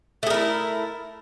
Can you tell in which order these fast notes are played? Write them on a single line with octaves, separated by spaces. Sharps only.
A3 G#4 A#4 E4